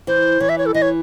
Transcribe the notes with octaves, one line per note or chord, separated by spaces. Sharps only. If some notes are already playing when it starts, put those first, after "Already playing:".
E3 C5
E3 C#5
E5
C#5
A4
E3 D#5
C#5